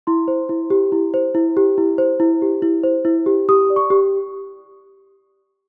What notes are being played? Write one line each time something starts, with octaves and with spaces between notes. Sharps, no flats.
E4 C6
C5
E4
G4
E4
C5
E4
G4
E4
C5
E4
G4
E4
C5
E4
G4
G4 D#6
D5
C#6
G4